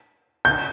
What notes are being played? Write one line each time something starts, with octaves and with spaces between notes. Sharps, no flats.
G6